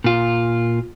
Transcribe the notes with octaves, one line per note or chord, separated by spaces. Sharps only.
A#2 F4